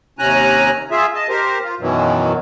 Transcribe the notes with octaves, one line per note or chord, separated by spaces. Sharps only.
D#2 C3 C#4 G#5 A#5 F#6
F4 G#4 E5
D#5 A5
G4 A#4 C5
F4
F#2 B2 D#3 E3 F#3